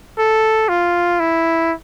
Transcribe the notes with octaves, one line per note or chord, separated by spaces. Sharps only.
A4
F4
E4